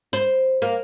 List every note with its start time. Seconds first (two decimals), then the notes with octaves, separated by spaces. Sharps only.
0.13 C5
0.62 A#3